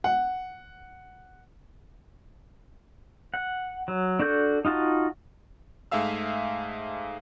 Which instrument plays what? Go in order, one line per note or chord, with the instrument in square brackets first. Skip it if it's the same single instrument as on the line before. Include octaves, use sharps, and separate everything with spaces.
[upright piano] F#5
[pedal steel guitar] F#5
F#3
D4 F#4 A4 G6
D#4 F4 F#4 A5
[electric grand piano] G#2 A3 G#4 E5 F5 E6